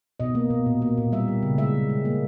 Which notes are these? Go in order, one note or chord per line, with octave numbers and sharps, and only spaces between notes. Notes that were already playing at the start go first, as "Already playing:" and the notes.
B2 D#5
A#3
B2
A#2
A#3
A#2
G3 E5
G3
C#3
G#3 E5
G#3
G#3
A#3